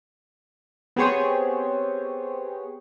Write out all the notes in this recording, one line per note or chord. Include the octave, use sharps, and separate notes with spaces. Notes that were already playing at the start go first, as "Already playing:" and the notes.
B3 C4 G4 G#4 C5 C#5